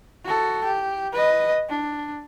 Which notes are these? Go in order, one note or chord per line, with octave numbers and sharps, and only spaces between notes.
F#4 A4
G4
B4 D#5
D4